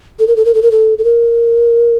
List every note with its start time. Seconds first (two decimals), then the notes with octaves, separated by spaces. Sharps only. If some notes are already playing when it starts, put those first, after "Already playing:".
0.19 A4
0.27 A#4
0.36 A4
0.45 A#4
0.54 A4
0.62 A#4
0.71 A4
0.98 A4
1.04 A#4